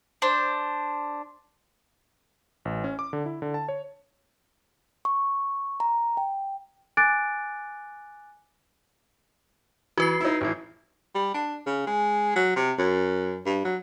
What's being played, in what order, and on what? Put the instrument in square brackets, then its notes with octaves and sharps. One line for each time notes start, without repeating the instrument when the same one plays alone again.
[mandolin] D4 C5
[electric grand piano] A1
C#4
D6
D3
E4
D3
A5
C#5
[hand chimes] C#6
A#5
G5
[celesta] G#5 D6 F#6 A6 D7
[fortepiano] E3 [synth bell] F#4 B4 C7
[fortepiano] D#4 E4
A1 E3
[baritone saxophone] G3
D4
C#3
G#3
F#3
C3
F#2
G2
F#3